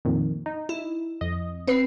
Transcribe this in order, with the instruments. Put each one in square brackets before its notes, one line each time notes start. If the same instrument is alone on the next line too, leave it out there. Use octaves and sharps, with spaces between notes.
[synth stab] F2 A#2 D#3
D#4
[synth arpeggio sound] E4
[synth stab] F2 D#5
[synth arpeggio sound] C4 B4 C7